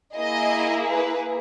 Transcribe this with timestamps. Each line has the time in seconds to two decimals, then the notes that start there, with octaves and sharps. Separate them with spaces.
0.15 A#3 E4 G#4 D#5
0.91 B4